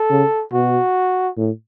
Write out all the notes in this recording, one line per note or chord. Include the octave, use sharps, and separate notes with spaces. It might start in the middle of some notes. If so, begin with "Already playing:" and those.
Already playing: A4
C#3
B2 F#4
A2